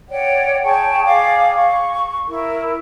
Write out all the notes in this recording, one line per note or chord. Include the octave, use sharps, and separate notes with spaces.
C#5 D5 F#5 G5
G#4 G5 A5 C#6
G#4 D5 F5 D6
C#6
E4 A#4